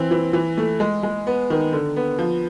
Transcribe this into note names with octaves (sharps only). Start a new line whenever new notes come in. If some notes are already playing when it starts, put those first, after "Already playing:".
Already playing: E3 C4
E3
E3
A3
G#3
G#3
B3
D#3
D3
B3
F3